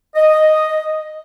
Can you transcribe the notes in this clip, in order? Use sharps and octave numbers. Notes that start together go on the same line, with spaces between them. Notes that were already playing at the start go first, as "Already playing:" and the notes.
D#5